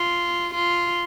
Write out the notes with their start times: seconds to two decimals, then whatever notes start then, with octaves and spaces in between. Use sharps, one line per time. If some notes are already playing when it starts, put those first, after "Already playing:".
Already playing: F4
0.55 F4